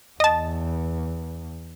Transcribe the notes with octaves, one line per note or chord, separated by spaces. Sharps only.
E2 D#5 A5